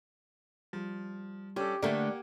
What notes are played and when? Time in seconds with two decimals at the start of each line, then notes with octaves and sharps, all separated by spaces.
0.73 F3 G3
1.56 C#4 D4 G4 A4
1.82 D3 A3 A#3 G4 D5 F#5 G#5